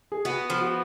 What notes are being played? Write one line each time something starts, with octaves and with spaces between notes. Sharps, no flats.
G#4
B3 F#4
F3
F#4